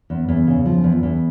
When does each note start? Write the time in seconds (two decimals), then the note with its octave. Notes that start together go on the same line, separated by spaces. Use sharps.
0.10 E2
0.29 E2
0.47 C#3
0.66 F3
0.84 E2
1.03 E2